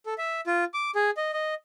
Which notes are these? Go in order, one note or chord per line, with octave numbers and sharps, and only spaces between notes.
A4
E5
F4
D6
G#4
D#5
D#5